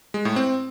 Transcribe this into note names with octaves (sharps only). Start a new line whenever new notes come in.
G#3
A2
C4